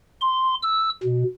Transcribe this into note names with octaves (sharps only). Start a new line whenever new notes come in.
C6
E6
B2